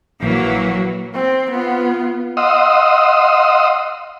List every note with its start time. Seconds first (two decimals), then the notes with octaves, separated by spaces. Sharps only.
0.22 A#1 E3 F#3 A#3
1.14 C4
1.51 B3 F4
2.37 D#5 F5 F#5 C6 D#6 E6